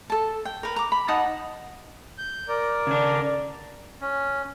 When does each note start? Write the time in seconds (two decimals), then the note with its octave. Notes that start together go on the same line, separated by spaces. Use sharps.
0.10 A4 A5
0.45 G5
0.63 A#4 B4
0.76 A#5 D6
0.92 B5
1.08 D#4 F#5 A5 D#6
2.18 G6
2.48 A#4 D5
2.87 C#3 D4
4.01 C#4